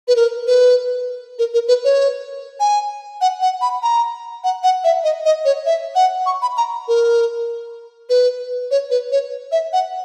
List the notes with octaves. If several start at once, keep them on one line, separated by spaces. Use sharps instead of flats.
B4
A#4
B4
A#4
A#4
B4
C#5
G#5
F#5
F#5
B5
A#5
F#5
F#5
E5
D#5
D#5
C#5
E5
F#5
C#6
B5
A#5
A#4
B4
C#5
B4
C#5
E5
F#5